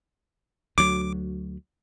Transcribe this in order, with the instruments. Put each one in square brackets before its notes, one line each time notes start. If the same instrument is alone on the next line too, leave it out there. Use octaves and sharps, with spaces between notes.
[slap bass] D2 F#3 [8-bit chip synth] D6